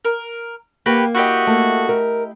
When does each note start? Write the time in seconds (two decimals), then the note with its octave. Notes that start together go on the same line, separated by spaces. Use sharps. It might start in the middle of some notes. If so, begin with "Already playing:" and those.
0.05 A#4
0.86 A#3 F#4 G4 B4
1.15 E4 F#4 G4 D#5
1.47 A3 A#3
1.89 A#4